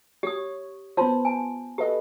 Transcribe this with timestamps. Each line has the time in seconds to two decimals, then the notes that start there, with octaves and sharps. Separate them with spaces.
0.23 G4 C#5 D#6
0.97 B3 F4 C5 A5 C6
1.25 G#5 A5
1.78 G4 A4 B4 D#5